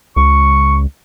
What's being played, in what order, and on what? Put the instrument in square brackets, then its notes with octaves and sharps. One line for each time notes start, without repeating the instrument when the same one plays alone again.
[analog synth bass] C#2 [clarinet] C#6